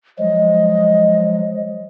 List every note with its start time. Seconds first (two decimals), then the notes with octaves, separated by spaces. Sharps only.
0.19 F3 F#3 G#3 D#5